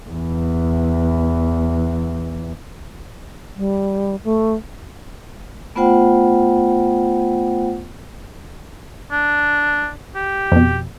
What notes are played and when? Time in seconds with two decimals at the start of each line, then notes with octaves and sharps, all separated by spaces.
0.10 E2 E3
3.57 G3
4.24 A3
5.76 A3 B3 F4 C5 F#5 G5
9.12 D4
10.15 G4
10.52 F2 B2